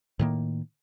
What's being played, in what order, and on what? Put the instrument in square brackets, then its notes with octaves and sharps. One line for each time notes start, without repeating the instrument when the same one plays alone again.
[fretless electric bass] A2 D#3 A#3